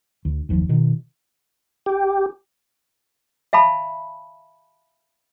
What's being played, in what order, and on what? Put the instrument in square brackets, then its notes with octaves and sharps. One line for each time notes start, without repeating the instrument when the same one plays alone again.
[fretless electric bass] D2
F#1 D#2 F3
B2 D#3
[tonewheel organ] G4
[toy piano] E5 F5 A5 B5